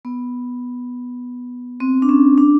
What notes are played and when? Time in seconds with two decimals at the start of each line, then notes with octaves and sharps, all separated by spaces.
0.05 B3
1.80 C4
2.02 D4
2.09 C#4
2.38 D4